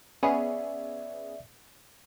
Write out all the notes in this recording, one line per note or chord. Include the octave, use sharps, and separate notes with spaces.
B3 C#4 G#4 D5 E5